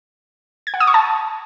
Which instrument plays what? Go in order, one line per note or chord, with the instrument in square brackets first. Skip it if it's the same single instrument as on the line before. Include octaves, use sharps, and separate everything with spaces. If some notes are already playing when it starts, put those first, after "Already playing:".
[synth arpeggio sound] G#6
F#5
D#6
C#6
A5